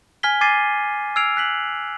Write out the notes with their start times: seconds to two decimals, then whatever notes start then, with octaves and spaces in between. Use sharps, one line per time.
0.23 G#5 F6 G#6 B6 G7
0.41 G#5 D6 G#6 A6 C7 D#7
1.16 E6 F6 G#6 C7 D7 F7
1.37 F#6 B6 F#7